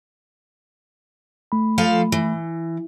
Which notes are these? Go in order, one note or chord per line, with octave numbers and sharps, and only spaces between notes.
A3 B5
F3 A4 F5
E3